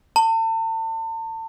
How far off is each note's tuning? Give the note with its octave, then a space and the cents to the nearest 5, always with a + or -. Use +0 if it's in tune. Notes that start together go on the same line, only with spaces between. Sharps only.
A5 +40